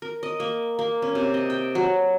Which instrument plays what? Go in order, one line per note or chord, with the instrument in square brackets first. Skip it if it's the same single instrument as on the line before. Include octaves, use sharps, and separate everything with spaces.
[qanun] A#4
D#5
A#3
A#3
C#4
C3
D#5
G5
F#3